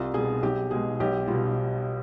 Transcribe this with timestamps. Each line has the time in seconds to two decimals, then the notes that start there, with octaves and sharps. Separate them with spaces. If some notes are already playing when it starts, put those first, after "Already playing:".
Already playing: C2 F4
0.14 B2 G3 G#4
0.43 B1 G4
0.71 B2 G#3 G#4
1.00 B1 G4
1.28 B2 G3 F4